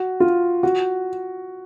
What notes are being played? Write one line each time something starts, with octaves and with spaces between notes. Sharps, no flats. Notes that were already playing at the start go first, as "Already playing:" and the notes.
Already playing: F#4
F4
F#4